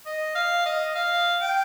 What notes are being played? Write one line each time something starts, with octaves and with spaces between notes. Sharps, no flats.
D#5
F5
D#5
F5
G5